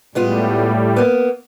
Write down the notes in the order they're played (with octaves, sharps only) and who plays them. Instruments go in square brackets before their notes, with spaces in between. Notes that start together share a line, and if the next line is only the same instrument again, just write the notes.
[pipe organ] A2 G3 [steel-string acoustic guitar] G#3 B3 F4
[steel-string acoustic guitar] A#3 B3